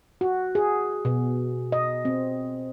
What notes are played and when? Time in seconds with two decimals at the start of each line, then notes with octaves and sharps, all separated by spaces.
0.21 F#4
0.55 G#4
1.05 B2
1.72 D#5
2.05 C4